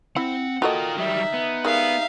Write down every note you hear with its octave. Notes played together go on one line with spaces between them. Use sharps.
C4 E4 F#5
D#4 F4 F#4 A4 A#4 D#5 G5
F#3 G3 E5
B3
D#3 G3 G#3 E5 F5